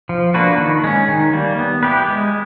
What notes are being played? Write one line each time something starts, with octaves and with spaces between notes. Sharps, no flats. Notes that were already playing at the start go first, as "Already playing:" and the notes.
F3
A#3 D4 F#4 B4
D#3
G#3 C#4
D#3
G3 A#3
B3
E4 G4 B4
G#3